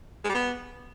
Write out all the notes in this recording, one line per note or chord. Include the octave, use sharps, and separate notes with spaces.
G#3
G3
B3